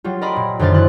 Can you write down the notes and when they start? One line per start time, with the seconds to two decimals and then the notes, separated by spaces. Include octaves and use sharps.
0.04 F#3 G3 F4
0.21 A#4 D5 D#5 B5 C6
0.36 A#2
0.59 F#2 D3 D#3 C5 F6 A6
0.74 E4 F#6 A6